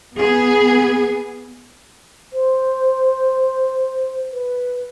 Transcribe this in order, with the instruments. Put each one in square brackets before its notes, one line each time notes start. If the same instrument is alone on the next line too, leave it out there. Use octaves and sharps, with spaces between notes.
[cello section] B3 G#4
[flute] C5
B4